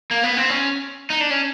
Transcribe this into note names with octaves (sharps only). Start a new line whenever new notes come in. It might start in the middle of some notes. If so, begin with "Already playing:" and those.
A#3
B3
C4
C#4
D#4
D4
C#4